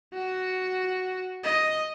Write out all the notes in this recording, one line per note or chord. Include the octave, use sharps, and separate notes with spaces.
F#4
D#5